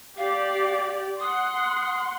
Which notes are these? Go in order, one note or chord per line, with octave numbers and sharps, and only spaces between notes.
G4 D5 F5
F#5 C6 D#6